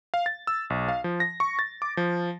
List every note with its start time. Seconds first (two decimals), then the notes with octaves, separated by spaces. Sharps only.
0.14 F5
0.26 A6
0.47 E6
0.70 B1
0.88 F5
1.04 F3
1.20 A#6
1.40 C#6
1.59 A6
1.82 D6
1.97 F3